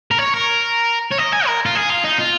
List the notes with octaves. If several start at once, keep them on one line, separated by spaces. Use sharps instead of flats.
A#4
C#5
A#4
C#5
D#5
G#5
A#4
F4
G#4
F4
D#4
F4